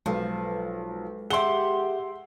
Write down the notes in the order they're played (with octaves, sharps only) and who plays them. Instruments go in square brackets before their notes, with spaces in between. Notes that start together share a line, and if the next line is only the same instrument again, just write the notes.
[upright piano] B1 [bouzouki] F3 [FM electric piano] G#3 A4 B4
[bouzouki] G4 F#5 [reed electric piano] G#4 E5 [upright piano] C6 G7